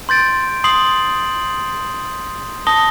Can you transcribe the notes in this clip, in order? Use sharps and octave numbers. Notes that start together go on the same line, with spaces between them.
C6 G6 A6 D7
C6 D#6 C7 F#7
A5 D#6 A#6 G7